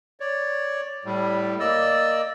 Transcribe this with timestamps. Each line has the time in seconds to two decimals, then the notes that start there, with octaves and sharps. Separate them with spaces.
0.20 C#5 D5
1.05 A2 G3
1.60 A#3 D5 D#5 E6